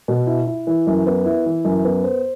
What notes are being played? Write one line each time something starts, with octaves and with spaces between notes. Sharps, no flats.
B2
E4
E4
E3
F#2
B3
E4
E3
F#2
B3
C5